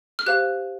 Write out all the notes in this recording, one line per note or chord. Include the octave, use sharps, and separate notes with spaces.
F6
G4 C5 F5 F#6